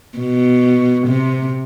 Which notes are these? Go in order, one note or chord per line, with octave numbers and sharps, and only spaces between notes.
B2
C3